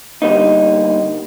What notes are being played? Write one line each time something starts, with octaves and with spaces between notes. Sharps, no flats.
D3 G3 A#3 D#4